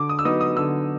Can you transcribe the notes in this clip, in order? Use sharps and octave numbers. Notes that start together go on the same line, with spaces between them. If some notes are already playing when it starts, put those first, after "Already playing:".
Already playing: D3 D6
D#6
E6
F#3 B3 D#4 D#6
D#6
D3 E6